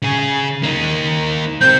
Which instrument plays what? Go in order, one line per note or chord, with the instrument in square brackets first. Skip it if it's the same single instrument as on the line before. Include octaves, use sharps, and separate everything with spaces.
[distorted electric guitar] C#3 G#4
A#3 D#4
[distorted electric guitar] C4 G4 [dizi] G6